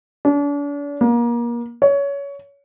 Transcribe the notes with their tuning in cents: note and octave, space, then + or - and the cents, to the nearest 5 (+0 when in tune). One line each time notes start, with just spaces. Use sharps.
D4 -40
A#3 +30
C#5 +20